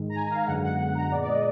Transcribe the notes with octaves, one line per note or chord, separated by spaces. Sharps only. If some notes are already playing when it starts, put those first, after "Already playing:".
Already playing: G#2 D#3 G#3
A#5
G#5
F5
F#2 D3 G#3 B3 F#5
F#5
A#5
A#2 G#3 B3 D5
D5
D#5